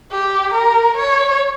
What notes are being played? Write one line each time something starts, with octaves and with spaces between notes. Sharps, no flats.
G4
A#4
C#5